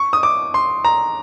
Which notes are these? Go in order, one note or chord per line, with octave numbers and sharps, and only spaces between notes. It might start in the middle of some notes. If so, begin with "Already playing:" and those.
Already playing: C#6
D#6
D6
C6
A#5